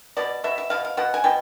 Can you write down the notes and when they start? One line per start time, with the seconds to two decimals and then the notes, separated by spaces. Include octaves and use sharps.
0.17 B2 D5
0.44 B2 E5
0.58 E5
0.70 B2 F5
0.85 F5
0.97 B2 F#5
1.14 G#5
1.24 B2 G5